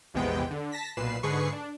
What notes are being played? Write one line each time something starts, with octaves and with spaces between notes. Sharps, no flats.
A#1 E2 C3 G#3 B3 G5
D3
A5 A#6 B6
B1 A#2 B4 C7 E7
G#2 D3 G#4 B4 C#6 C7
D4